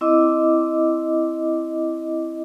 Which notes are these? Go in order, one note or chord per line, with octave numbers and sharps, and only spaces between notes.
C4 E4 D#5 D6